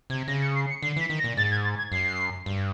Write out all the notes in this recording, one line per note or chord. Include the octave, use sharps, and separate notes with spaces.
C3 G#6
C#3 A#6
C#7
C7
C#7
D3 C7
E3 B6
D#3
A#6
A#2
G#2 A6
G#6
A6
G#6
F#2 C7
G2